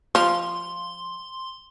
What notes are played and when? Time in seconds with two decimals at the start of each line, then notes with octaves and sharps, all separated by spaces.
0.15 F3 F4 C6